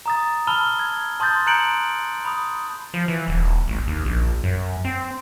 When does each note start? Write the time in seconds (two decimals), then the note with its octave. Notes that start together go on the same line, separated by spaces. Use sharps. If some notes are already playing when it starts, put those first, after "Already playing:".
0.06 A#5 D#6 A6
0.47 A5 B5 E6 F6 G7
0.79 G#6
1.20 A5 C6 D#6 G6 A6
1.47 A#5 F#6 G6 C#7 D7 F#7
2.25 B5 D#6
2.94 F3
3.08 E3
3.28 D#1
3.68 A1
3.87 D#2
4.05 A#1
4.44 F#2
4.85 C4